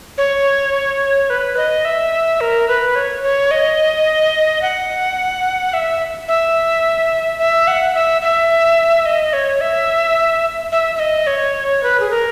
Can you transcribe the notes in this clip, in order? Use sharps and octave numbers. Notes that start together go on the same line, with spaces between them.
C#5
B4
D#5
E5
A#4
B4
C#5
C#5
D#5
F#5
E5
E5
E5
F#5
E5
E5
D#5
C#5
E5
E5
E5
D#5
C#5
B4
G#4
A#4